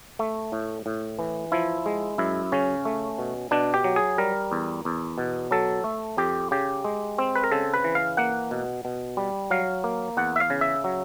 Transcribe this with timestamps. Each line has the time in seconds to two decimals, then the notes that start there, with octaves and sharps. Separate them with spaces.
0.19 A3
0.52 A2
0.86 A2
1.19 E3
1.52 F3 E4
1.86 G#3
2.18 F#2 E4
2.52 C#3 C#4
2.85 A3
3.18 B2
3.51 B2 D4
3.74 G4
3.84 F#3
3.96 G#4
4.18 G3 A#4
4.52 E2
4.85 E2
5.18 B2
5.51 F#3 A4
5.84 A3
6.17 F2 G4
6.51 C#3 G4
6.84 G#3
7.18 C4
7.36 B4
7.44 A#4
7.52 C#3 A4
7.74 B4
7.84 E3
7.95 F5
8.17 A#3 F#5
8.51 B2
8.85 B2
9.17 G3
9.51 F#3 F5
9.84 A#3
10.17 E2 F#5
10.36 E5
10.40 F5
10.50 C#3
10.61 E5
10.84 F#3